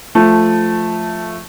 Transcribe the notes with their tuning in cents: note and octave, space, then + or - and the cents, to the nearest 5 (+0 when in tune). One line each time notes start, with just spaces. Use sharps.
F3 +0 A3 +0